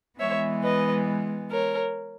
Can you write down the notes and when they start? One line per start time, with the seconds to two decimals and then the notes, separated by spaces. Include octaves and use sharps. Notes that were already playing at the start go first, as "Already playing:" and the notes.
0.19 E3 G#3 B3 C#5 E5
0.63 B4 D#5
1.51 A#4 C#5